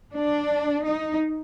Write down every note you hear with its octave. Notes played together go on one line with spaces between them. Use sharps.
D4
D#4